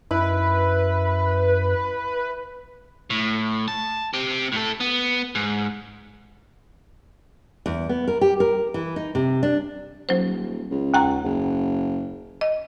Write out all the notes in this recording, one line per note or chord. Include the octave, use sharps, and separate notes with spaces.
F#2 E4 B4
A2
A5
C4 G4
A2 A4
B3
G#2
E2
B3
A#4
G4
A#4
E3
D#4
C3
D4
D#1 F#3 C5
C#2
D#2 F#5 A#5
F#1
D#5